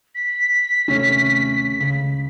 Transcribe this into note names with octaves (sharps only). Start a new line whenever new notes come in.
B6
D#2 C3 A3 C#4
C#2 C#3